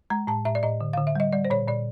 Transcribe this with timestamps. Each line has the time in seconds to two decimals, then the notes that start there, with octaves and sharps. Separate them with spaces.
0.10 G#3 A#5
0.27 A2 A5
0.45 A2 E5
0.55 D5
0.63 A2 D#5
0.81 D3
0.93 D3 F5
1.07 E5
1.15 G3 D#5
1.33 G3 D5
1.45 C5
1.50 A#2 C#5
1.68 A#2 D5